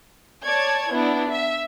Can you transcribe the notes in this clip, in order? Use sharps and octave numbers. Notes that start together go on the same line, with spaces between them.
C#5 D5 A5 G#6
B3 D4 E4
E5